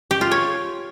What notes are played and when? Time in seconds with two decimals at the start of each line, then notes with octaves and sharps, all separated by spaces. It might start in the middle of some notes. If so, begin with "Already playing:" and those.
0.11 G4
0.21 F4
0.31 C#5